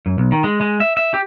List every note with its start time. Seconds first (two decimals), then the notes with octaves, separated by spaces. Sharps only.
0.06 F#2
0.18 B1
0.32 D#3
0.44 G#3
0.61 G#3
0.80 E5
0.97 E5
1.14 G4